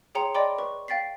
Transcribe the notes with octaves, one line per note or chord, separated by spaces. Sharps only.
G#4 C#5 G5 A#5 C6 C#7
D5 D#5 G5 B5 C6 D6
B4 C#6
F5 G5 A6 B6 C7